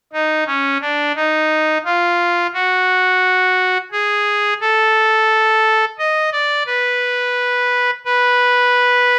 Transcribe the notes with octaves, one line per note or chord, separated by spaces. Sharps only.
D#4
C#4
D4
D#4
F4
F#4
G#4
A4
D#5
D5
B4
B4